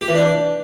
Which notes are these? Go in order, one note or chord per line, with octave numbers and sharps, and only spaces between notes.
G4
E3
D4